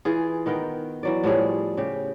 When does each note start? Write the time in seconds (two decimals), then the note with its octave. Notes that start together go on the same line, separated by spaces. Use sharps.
0.05 E3 F4 G#4
0.46 D#3 B3 A#4 G5
1.03 E3 F#3 D5
1.24 A2 F3 G3 G#4
1.77 C#3 G4